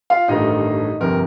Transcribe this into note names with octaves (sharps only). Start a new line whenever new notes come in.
F4 F5
A1 G2 D#3 A3 D#4 D#5
G1 F2 C3 A#4